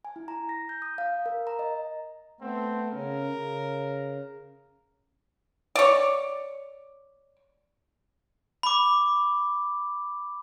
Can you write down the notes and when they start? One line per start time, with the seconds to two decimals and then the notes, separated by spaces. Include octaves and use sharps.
0.05 G#5
0.16 E4
0.28 A#5
0.49 A#6
0.69 G6
0.82 D#6
0.98 F5
1.26 A#4
1.47 A#5
1.59 D#5
2.41 A3 B3 C4
2.92 C#3 C#4 A#4
3.31 C#3
5.75 C#5 D5
8.63 B5 D6